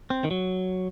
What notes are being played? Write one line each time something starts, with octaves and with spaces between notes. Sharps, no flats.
C4
D#3
F#3